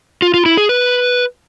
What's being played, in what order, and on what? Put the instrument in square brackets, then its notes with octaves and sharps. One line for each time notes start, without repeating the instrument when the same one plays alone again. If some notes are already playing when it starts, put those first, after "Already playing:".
[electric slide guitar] F4
F4
E4
G#4
B4